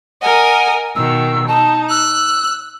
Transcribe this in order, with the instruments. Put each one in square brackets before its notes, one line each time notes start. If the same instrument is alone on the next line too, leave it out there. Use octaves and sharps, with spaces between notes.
[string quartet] A#4 D#5 G#5 [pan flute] F#5
[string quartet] B2 D#3 [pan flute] E6
[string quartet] D#4 [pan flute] A5
[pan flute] E6 [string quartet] F#6